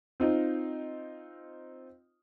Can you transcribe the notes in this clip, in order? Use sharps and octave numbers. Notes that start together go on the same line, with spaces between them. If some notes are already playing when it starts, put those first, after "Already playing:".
C4 D#4 F4